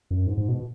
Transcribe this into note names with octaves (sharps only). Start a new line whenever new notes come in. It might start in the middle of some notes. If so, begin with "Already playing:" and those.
F#2
G#2
G#2
B2